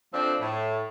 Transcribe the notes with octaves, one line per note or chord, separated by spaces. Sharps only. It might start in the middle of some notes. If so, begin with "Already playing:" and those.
F3 A3 C4 D4
A2